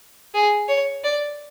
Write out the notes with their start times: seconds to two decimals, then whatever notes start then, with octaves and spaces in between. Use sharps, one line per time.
0.34 G#4
0.68 C#5
1.04 D5